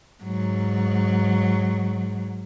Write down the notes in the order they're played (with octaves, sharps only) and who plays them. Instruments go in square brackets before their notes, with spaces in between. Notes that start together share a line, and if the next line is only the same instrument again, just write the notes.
[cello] G#2 F#3